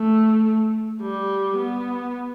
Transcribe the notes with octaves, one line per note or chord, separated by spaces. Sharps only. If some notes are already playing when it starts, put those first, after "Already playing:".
Already playing: A3
G3
B3